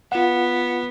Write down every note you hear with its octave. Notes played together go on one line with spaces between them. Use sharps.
B3 F4 F#5